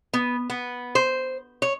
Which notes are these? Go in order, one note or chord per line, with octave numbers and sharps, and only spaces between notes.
B3
B3
C5
C#5